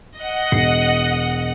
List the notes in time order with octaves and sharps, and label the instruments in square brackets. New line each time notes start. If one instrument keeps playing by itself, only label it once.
[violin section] D#5 F#5
[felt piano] E1 C7